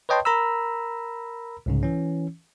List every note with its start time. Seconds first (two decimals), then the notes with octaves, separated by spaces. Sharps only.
0.09 B4 C#5 D#5 G5 A5 C6
0.25 A#4 A#5 B5 E6
1.66 C2 G#2 C#3
1.83 E3 C#4